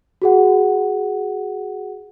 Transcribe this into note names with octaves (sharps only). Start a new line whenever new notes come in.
F#4 G#4 F#5